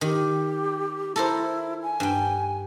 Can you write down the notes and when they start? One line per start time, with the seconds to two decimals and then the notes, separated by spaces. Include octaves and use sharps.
0.01 D#3 G4
1.16 E4 A4 A#4 C5
1.83 G#5
2.00 G2 G5